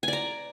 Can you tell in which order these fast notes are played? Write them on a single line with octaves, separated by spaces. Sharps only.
G#5 D5 A#5